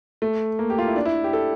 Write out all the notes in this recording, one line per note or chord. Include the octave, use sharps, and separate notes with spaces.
A3
A#3
G4
F4
E4
D4
E4
G4
A4